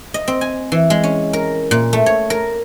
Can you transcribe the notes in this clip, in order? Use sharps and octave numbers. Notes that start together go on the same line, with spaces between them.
D#5
C4
G#5
E3
G#3
C#4
A#4
A#2
A3
C#5
A#4